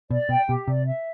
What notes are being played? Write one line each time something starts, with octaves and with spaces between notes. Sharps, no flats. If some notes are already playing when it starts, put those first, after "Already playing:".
B2 D5
B2 G5
B2 G4
C3 D5
E5